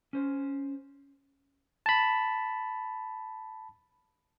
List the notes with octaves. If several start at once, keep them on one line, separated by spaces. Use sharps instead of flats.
C#4 C5
A5 B5